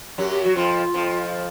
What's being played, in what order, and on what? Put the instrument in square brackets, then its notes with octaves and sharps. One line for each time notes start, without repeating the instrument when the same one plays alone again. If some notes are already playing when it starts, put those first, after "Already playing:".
[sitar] F#2 F#3 [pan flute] G4
[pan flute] G4
[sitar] F#3 [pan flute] F#4
[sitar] F2 F3 [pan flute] F4
[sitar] F2 F3